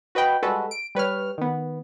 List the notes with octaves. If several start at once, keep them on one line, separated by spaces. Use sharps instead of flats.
F#4 B4 D#5 G5 B5
G3 G#3 F#4 A4 B4
D7
G3 B4 C#5 F6
D#3 B3